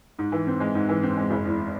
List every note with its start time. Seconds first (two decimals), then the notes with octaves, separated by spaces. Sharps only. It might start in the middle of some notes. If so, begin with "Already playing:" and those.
0.19 G#2
0.32 E3
0.47 C4
0.60 G#3
0.75 G#2
0.89 E3
1.03 C4
1.17 G#3
1.31 F#1
1.45 E2